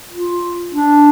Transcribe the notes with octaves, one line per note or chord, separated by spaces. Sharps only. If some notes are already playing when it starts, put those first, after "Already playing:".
F4
D4